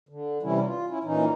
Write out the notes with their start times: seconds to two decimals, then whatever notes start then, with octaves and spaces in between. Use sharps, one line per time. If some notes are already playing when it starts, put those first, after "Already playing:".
0.09 D3
0.43 C3 E3 G3 C#4 E4
0.65 F4
0.89 C#4 E4
1.04 A#2 E3 C#4 D#4